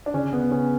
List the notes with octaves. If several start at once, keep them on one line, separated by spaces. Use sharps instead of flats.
D4
C#3 C#4
B3
C#3 C#4